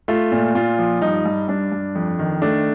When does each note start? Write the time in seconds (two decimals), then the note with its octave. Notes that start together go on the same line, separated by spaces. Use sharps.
0.08 A3 F4
0.32 A#2
0.55 A#2 F4
0.78 F3
1.02 G2 D#4
1.25 G2
1.48 G2 D4
1.72 G2
1.95 F2
2.19 D#3
2.42 A3 D4